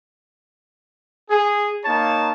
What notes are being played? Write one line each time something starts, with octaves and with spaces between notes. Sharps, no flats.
G#4
A#3 D#4 C#5 A5